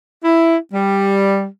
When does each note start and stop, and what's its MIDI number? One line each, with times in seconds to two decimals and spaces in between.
0.24 0.56 64
0.74 1.47 55